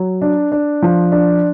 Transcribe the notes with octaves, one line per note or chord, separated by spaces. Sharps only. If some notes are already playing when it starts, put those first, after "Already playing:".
Already playing: F#3
D4
D4
F3
D4